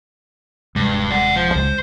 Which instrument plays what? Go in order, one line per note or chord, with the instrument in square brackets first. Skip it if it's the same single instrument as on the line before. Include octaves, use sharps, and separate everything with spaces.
[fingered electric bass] D#1 C3 G#3 [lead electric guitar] G2
[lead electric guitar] D5 F#5
F3 C5
[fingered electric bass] C#2 C#3 G#3 [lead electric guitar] C5